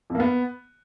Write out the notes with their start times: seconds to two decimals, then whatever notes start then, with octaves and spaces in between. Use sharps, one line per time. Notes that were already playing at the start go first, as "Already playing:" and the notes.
0.10 F2
0.15 A#3
0.20 B3